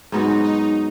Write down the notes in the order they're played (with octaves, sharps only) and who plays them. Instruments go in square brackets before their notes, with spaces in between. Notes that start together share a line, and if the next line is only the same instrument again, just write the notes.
[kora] G#2 F#3 B3 F#4 [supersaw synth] D#4
[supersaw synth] D#4